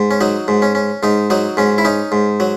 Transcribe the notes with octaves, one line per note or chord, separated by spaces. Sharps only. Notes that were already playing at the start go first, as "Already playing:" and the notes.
Already playing: G#2
C#4
F#3 D#4
G#2
C#4
C#4
G#2 D#4
F#3 D#4
G#2 C#4
E4
C#4 D#4
G#2
F#3